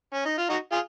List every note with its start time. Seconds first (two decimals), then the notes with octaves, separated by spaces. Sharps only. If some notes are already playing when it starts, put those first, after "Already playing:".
0.14 C#4
0.25 D#4
0.38 F4
0.50 D#4 F#4
0.72 F4 G#4